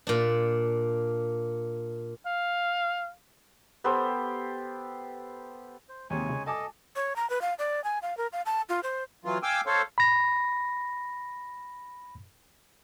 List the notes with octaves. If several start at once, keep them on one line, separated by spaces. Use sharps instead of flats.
A#2 D4
F5
B3 G4 A4 C5
C5
D#2 C3 G#3 C#5 G#5
C#3
A4 D#5 G#5 A5 D6
C#5
A#5
B4
F5
D5
G#5
F5
A#4
F5
A5
F4
C5
E3 F#3 F4
F5 G5 G#5 D6 E6
A4 C5 C#5 F5
B5 A#6